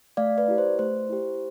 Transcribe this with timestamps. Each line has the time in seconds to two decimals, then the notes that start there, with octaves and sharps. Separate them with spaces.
0.17 A3 D5 F5
0.38 B4 D5
0.48 E4 G4
0.58 C5
0.79 A3 C5
1.10 E4 G4